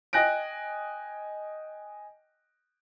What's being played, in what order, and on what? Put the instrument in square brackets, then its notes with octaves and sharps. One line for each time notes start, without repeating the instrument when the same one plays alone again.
[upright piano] D#5 G5 G#5 F#6 A#6 D7